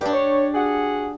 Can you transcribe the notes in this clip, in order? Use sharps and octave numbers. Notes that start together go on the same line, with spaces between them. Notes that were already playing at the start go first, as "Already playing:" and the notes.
G2 D4 G4
C#5
F#4 G#4 F#5